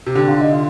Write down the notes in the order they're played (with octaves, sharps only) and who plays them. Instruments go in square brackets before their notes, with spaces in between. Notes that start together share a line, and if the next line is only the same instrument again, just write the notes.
[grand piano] C3
[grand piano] D3 [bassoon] G4
[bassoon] F4
D#4
F4